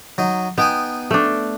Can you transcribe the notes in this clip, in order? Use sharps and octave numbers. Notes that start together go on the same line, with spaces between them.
F#3 D#4
B3 D#4 G5 G#5
A3 D4